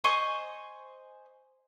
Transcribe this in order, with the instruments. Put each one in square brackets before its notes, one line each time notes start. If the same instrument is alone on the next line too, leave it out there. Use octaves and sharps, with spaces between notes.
[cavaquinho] C5 D#5 G#5 C#6